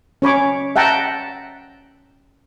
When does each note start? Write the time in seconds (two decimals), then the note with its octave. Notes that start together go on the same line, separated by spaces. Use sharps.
0.22 C#4 C#5 B5 D6
0.76 E5 F#5 G5 A5 A#5